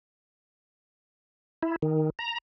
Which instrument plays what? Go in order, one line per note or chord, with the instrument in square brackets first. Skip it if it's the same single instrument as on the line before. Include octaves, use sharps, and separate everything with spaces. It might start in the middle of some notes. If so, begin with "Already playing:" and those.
[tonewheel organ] E4
D#3
A#5